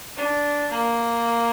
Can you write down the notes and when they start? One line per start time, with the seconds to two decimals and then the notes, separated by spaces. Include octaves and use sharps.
0.17 D4
0.71 A#3